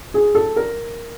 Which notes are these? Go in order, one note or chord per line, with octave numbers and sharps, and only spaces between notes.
G#4
A4
A#4